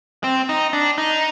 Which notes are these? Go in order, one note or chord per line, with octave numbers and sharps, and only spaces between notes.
C4
D#4
D4
D#4